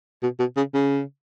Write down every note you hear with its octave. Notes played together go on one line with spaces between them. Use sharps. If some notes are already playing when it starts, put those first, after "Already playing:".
B2
B2
C#3
C#3